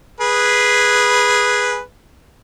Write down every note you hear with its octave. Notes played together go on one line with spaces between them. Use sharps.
G#4 B4